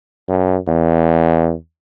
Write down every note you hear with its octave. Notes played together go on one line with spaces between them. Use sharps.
F#2
E2